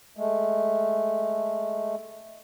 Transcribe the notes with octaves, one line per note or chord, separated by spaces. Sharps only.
G#3 A3